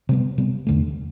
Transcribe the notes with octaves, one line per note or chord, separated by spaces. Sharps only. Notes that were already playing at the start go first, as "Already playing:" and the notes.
C3 G3 B3
C3 G3 B3
E2 D3 A3